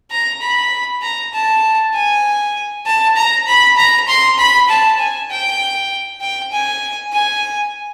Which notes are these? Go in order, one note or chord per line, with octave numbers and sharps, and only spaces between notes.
A#5
B5
A#5
A5
G#5
A5
A#5
B5
A#5
C6
B5
A5
G#5
G5
G5
G#5
G#5